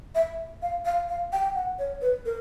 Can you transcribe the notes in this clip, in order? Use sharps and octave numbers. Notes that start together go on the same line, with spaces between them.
E5
F5
F5
F5
G5
F#5
C#5
B4
A#4